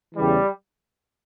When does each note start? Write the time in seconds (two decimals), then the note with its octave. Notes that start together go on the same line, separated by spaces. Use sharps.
0.15 E2 C#3 E3 G3